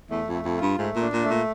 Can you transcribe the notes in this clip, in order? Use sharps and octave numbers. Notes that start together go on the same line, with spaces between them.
E2 A3
F2
A3
F2
F4
G2
G#2 A3
A#2
D4
A#2
A3
A#2